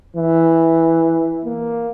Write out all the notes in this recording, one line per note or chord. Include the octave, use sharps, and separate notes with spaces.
E3
A#3